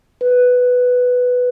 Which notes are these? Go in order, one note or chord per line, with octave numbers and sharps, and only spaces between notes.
B4